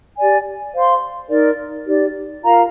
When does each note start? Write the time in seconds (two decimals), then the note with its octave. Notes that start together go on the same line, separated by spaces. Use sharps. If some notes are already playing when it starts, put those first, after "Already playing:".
0.17 G4 D5 G#5
0.74 C5 F5 C6
1.29 D#4 A#4 D5
1.87 D#4 G4 D5
2.43 F4 A#4 F5 A#5